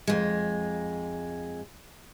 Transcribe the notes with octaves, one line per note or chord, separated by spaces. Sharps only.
F2 G#3